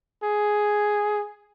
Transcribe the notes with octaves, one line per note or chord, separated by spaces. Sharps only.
G#4